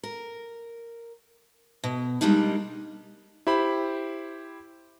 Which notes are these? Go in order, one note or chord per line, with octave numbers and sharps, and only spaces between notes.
A#4
B2
G3 G#3 A#3 D4 D#4
E4 G4 C5 B5